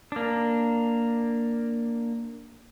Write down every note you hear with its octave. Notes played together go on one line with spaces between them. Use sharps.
A#3 D4